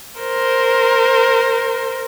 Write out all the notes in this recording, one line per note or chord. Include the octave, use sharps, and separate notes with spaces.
A#4 C5